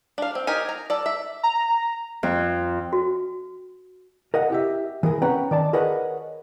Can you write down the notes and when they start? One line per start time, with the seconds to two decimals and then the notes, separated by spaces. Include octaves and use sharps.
0.18 D4 F5
0.35 C4
0.47 D#4 G4 A#4 G#5
0.69 A#5
0.90 A4 D5
1.06 E5
1.43 A#5
2.23 F2
2.93 F#4
4.34 A#4 D#5 F#5
4.50 E4 G4 E5
5.03 E3 G#4 A#4
5.22 C4 C#4 B4 F#5 G5 A#5
5.51 D#3 D5 A5
5.73 G#4 A#4 B4 C#5 D#5 F#5